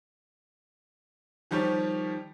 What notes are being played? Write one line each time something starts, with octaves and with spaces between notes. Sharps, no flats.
D#3 F3 G3 G4 C#5